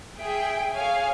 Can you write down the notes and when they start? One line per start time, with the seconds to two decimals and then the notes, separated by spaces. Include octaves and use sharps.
0.18 G#4 E5 G5
0.72 G#4 C#5 F5 G#5